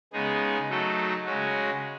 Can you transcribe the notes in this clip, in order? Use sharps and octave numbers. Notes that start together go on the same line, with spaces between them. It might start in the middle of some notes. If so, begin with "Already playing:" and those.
C#3 G#3 B3 D#4 G#4
F#3 A3 D#4 A4
C#3 G#3 C#4 F#4